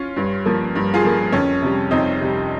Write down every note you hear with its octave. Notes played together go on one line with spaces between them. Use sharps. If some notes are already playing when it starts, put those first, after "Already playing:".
Already playing: C#4 F4
G2
F3 A#3
G2
F4 G#4
F3 A#3
F2 C#4
C3 G3
F2 C4 D#4
C3 G3